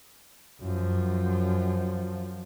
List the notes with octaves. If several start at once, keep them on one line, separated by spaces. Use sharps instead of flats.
F#2 F3